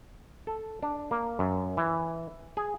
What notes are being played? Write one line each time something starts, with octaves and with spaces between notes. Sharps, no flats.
A4
D4
A#3
F#2
E3
G#4